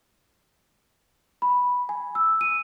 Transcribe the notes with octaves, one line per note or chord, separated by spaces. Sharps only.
B5
G#5
E6
D#7